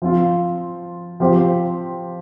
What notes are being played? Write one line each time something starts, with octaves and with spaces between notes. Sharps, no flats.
F3 C4 F4
F3 C4 G4 C5